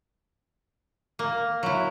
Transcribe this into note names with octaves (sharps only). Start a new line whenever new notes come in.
A#3
F#3 E4